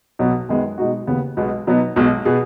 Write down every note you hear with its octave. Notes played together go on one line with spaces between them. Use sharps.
B1 B2 F#3 B3
F#2 D#3 G#3 B3
B2 G#3 D#4 F#4
D#2 C#3 B3
B1 B2 G#3 B3
B2 F#3 B3 D#4
B1 B2 G#3
B2 B3 G#4